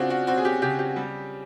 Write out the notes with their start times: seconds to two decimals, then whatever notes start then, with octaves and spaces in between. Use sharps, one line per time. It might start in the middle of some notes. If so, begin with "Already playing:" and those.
Already playing: C#3 C4 D4 F4 F#4
0.10 F#4
0.27 C4 F#4
0.37 G#4
0.45 G4
0.62 C#3 G4
0.79 G4
0.96 G3